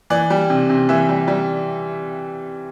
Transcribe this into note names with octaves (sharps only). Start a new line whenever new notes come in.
E3 D5
G3
C3
C3
E3 E5
G3
G3